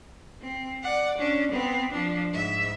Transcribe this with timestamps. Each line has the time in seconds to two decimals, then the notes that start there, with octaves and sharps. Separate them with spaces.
0.42 C4
0.83 D5 F#5
1.19 C#4 D4
1.52 B3 C4
1.92 F3 D4
2.32 G#2 E5